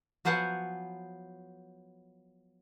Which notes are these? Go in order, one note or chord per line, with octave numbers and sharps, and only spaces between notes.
F3 F#3 B3 C5 F#5 G#5